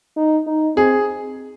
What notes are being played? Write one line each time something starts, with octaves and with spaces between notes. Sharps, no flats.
D#4
D#4
C4 G#4